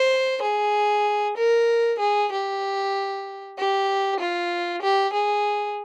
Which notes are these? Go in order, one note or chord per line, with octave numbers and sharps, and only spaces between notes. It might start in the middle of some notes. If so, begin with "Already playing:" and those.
Already playing: C5
G#4
A#4
G#4
G4
G4
F4
G4
G#4